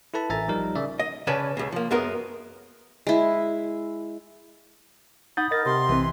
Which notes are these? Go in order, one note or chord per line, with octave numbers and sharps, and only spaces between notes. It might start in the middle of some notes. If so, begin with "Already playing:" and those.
E4 A4 B4 A5 B5
A1 E5 G#5 A#5 A6
F3 G3 D#4 A#4
C#3 D5 E5
D#5
C#3 C#4 B4 D5 G#5 A5
C#2 C#3
F3 A#3
F#2 G#3 B3 A#4
G#3 E4
D#4 F#5 B5 D#6 G6 A6
A#4 D#5 A6 A#6
C3 C6
A#1 E3 C4 B4